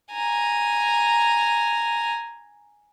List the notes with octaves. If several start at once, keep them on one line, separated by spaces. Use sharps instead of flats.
G#5 A#5